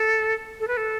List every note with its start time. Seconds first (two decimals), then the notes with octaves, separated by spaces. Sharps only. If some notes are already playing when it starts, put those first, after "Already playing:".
Already playing: A4
0.60 A4
0.68 B4
0.77 A4